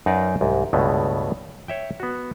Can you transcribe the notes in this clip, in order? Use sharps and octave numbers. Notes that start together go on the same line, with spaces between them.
F#2 D#4 B4 D5 F5 A#5
C2 G#2
C#2 G2 B2 G#3 A3
C#5 E5 G5
B3 F#4